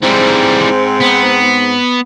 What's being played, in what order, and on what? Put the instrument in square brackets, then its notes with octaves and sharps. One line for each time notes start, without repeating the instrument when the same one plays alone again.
[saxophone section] G#2 C4 [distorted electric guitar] E3 G3
[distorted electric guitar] B3